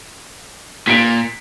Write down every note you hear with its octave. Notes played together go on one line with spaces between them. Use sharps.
A#2 B6 C#7 D7